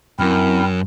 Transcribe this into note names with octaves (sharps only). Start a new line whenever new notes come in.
F#2 C4 E4 A#4